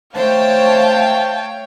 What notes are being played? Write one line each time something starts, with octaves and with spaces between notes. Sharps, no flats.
A3 C5 C#5 F5 G5 A5